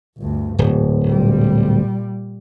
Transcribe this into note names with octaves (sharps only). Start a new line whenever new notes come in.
G1 D2
D1 G#2
A#2 G3